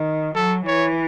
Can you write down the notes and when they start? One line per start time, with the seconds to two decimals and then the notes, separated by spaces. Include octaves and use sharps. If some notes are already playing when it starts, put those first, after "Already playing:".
Already playing: D#3
0.35 F#3 A4
0.65 E3 C#5